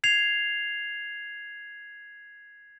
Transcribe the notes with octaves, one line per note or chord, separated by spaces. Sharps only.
G#6 C7 F7